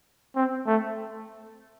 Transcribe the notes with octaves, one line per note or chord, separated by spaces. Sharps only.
C4
A3